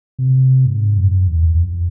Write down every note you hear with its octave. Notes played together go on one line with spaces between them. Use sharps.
C3
G#2
F#2
E2
E2
F2